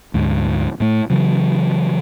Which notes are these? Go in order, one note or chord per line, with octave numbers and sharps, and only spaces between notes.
D2 G#2
A2 A3
C#3 E3 F#3